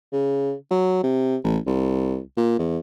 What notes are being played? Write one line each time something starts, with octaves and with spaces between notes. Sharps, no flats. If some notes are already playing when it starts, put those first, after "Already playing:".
C#3
F#3
C3
A1
C2
A#2
E2